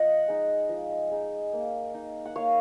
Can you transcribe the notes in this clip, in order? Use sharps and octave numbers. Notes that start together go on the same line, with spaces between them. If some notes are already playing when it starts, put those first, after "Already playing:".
Already playing: F3 D#5 F#5
G#3 D#4
F3
G#3 D#4
A#3
D#4
F#5
A#3 C#5 F5